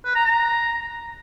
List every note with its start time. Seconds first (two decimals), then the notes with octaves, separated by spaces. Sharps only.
0.05 B4
0.15 A#5
0.26 A#5